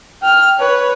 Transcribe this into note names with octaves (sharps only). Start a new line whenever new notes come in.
G5 F6
B4 C#5